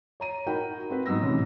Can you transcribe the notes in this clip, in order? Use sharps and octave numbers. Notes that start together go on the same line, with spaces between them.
C#5 A#5 D#7
D#4 F#4 A#4 G5 B5
C4 F#4 B4
G#2 F#3 B3 E6 A#6
A2 C3 E3 C#4